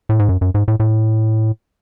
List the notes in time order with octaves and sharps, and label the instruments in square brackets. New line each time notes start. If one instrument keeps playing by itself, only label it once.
[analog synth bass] A2
G#2
F#2
F#2
G#2
A2
A2